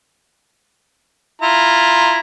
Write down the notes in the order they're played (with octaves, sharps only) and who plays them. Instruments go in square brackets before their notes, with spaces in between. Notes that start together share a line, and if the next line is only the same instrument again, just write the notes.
[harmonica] E4 F4 A#5